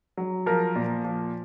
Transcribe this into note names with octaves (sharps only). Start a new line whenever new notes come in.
F#3
F3 A#4
A#2
F3